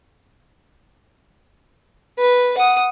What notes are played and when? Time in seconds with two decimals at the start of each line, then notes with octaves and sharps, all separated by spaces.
2.19 B4
2.57 F#5 D#6